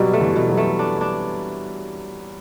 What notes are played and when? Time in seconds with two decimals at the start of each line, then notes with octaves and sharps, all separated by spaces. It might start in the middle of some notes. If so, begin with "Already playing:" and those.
Already playing: B2 F#3 G3
0.13 A3
0.21 E3
0.36 B2
0.50 F#3
0.57 A3
0.79 D4
1.01 D4